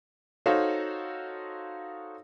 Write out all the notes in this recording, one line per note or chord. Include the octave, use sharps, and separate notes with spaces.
D#4 F#4 A4 C5 C#5 F5